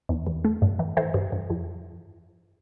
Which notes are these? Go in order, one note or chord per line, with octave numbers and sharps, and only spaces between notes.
E2
E2
A3
G2
E3
E3 A4 C5
G2
G2
F2